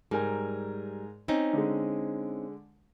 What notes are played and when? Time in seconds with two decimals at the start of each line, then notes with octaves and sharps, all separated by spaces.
0.11 G#2 G3 A#4 G#5
1.28 C4 C#4 D#4
1.53 D3 G#3